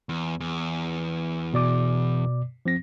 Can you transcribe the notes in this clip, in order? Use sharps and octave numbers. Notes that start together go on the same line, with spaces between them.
E2
E2
B2 D5 D6
F3 C4 A#6